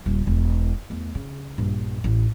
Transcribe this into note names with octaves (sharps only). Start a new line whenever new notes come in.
D#1 C#3
E1
E2 A3
C#3
A#1 G2
A1